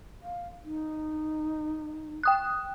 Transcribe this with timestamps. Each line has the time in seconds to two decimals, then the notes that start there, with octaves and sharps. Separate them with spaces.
0.23 F5
0.64 D#4
2.23 G5 D#6 F#6